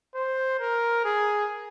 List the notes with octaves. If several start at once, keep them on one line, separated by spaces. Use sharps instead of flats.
C5
A#4
G#4